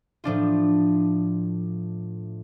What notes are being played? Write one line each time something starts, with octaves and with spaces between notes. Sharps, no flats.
A2 F3 D4 F4